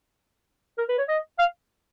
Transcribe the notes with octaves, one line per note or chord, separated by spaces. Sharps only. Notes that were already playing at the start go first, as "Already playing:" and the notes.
A#4
B4
C#5
D#5
F5